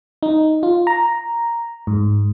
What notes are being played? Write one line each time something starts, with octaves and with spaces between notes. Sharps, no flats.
D#4
F4
A#5
G#2